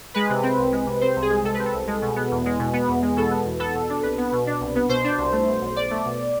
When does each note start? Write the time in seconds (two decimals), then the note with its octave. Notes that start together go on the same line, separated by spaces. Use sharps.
0.14 G#3 B4
0.30 C3
0.43 C4
0.58 C2
0.72 G#3
0.86 C3
1.01 C4 C5
1.16 C2
1.22 G#4
1.30 G#3
1.44 C3 A4
1.54 B4
1.59 C4
1.66 A4
1.74 C2
1.87 G#3
2.02 B2
2.16 B3
2.31 E2
2.46 G#3
2.59 B2
2.73 B3
2.88 E2
3.02 G#3
3.16 B2 A4
3.31 B3
3.46 E2
3.60 B3 A4
3.75 B2
3.90 D4
4.03 C2 B4
4.18 B3
4.32 B2
4.47 D4
4.61 C2
4.75 B3
4.89 B2 C5
5.04 D4
5.18 C2
5.32 A3
5.48 B2
5.61 B1
5.76 B1 D5
5.91 A3
6.05 B2